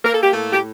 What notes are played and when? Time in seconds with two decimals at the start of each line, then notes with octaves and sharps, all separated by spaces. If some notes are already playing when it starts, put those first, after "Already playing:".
0.05 A#3 A#4
0.15 A4
0.23 G4
0.31 A2 A3 A4
0.53 G4